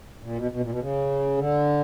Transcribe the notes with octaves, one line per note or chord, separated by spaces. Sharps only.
A#2
B2
B2
A#2
B2
C#3
D3